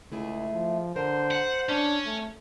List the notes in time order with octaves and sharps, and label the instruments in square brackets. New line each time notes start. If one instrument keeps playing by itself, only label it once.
[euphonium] C#2 [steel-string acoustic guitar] A3 E4 G#4
[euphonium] F3
[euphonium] D3 [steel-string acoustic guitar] A#4 [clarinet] C5
[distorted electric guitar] F#5
[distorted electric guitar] C#4 [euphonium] D4
[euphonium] A3